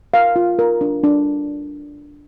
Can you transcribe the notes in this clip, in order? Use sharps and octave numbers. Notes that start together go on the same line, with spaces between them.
A#4 F5
F4
A#4
D4
D4